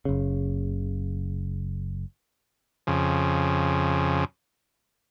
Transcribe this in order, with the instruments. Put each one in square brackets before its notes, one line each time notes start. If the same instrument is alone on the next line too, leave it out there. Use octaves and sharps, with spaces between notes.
[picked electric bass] F#1 C#3
[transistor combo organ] F2 C#3